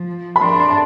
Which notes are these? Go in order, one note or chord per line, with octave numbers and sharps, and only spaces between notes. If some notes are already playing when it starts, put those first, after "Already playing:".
Already playing: F3
B5
D4 C6
C6
A5